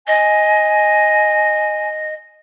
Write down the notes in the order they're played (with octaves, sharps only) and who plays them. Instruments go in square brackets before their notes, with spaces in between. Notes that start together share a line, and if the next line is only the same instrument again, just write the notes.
[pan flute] D#5 [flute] G#5